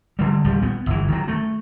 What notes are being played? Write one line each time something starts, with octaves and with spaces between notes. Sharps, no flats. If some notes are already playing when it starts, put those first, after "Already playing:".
D3 G3
D#1 A#1 F3 G3
B3
G1 E3
D#3 F#3
A3